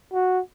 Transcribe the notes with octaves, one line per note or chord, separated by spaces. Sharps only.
F#4